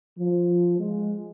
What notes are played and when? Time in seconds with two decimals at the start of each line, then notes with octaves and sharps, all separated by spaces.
0.17 F3
0.79 G#3